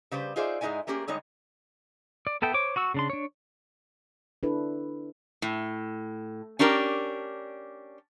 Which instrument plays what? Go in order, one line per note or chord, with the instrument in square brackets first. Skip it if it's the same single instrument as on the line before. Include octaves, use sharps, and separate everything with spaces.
[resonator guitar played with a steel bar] C#3 G3 B4 C5
D#4 F4 G#4 C5 D5 E5
G#2 G#3 A#3 D#4 E4 G#5
A3 A#3 C#4 G4 G#4 A#4
D3 G3 G#3 D#4 C#5
[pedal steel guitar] D5
B3 A4 E5 G5
C5 C#5 D6
F#4 C#6 E6
C#3 D4 C6
D4 C#5
[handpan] D4 E4 A4 B4
[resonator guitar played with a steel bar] A2
C#4 D4 G4 A#4